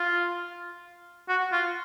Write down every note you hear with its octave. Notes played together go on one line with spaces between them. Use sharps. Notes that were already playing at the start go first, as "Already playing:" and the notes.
Already playing: F4
F#4
F4